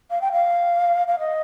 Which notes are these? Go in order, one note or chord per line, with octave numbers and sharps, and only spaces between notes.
F5
G5
F5
F5
D#5